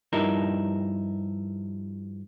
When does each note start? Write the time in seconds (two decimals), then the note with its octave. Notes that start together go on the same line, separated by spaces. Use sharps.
0.13 G2 F3 D#4 E4 A#4